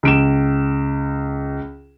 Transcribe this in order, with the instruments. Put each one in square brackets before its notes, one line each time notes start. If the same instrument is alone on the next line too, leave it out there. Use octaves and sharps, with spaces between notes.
[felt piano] C#2 D7 E7